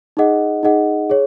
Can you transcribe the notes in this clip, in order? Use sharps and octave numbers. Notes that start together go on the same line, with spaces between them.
D#4 G#4 D#5 F#5
D#4 G#4 D#5 F#5
G#4 C#5